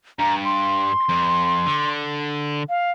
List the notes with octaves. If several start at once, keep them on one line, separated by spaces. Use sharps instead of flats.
G2 A#5
C6
F2
D3
F5